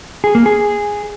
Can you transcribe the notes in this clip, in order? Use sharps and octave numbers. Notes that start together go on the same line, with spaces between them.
G#4
A#3
G#4